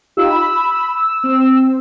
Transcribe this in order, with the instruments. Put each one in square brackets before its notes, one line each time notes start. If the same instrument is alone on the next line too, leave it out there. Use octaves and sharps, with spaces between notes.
[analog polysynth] D#4 F4 G4 [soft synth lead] E6
[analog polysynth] B5
C4